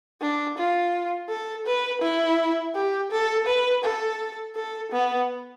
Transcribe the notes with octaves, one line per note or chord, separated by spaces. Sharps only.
D4
F4
A4
B4
E4
G4
A4
B4
A4
A4
B3